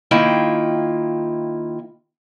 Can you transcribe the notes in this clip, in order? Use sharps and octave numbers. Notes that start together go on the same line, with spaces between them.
D#3 A#3 E4 F4 G5